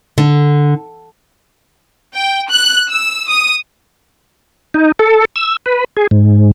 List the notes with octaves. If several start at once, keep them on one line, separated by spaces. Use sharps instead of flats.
D3
G5
F#6
E6
D#6
D#4
A4
E6
B4
G#4
G#2